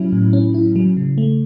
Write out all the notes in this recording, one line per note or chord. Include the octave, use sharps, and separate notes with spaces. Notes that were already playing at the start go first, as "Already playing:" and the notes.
Already playing: A2 F#3 C#4 E4
A2
C#4
E4
F#3
C#3
A3